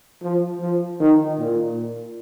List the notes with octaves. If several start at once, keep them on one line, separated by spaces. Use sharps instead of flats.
F3
F3
D#3
A#2